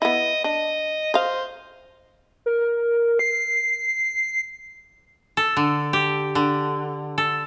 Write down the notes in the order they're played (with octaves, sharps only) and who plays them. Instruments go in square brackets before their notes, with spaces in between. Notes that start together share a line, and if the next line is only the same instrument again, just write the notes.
[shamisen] B3 E4 [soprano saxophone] D#5
[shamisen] D4 [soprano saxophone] D#5
[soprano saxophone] C5 [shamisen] D#5 F5
[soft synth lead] A#4
C7
[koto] A4
D3
G4
D3
A4